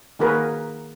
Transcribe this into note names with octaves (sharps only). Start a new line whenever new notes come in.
D#3 A#3 F#4 G#4 A#4 B4